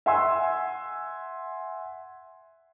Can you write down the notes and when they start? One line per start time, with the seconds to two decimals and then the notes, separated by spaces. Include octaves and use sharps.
0.06 E5 F#5 G#5 C6 E6